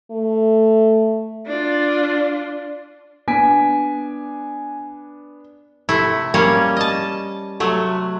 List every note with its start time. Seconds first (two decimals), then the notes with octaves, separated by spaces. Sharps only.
0.11 A3
1.47 D4 F4
3.28 B3 D4 G#5 B6 D7
5.89 C3 A3 E4
6.34 G3 A#3 C#4
6.77 D#5 A5
7.60 C3 F#3 A3